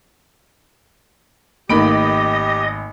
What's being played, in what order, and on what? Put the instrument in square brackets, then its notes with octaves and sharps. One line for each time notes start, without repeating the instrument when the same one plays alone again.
[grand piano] G#1 B5 D7 [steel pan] A3 A#3 D#4 [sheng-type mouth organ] G4 [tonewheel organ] D#5